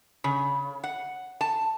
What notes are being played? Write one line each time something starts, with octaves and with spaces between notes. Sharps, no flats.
C#3
F#5
A5